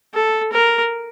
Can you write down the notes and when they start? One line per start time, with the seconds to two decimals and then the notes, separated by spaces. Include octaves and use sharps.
0.14 A4
0.53 A#4